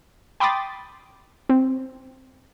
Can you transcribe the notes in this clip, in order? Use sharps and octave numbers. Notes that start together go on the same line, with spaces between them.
G5 B5 C6 D6 D#6 A6
C4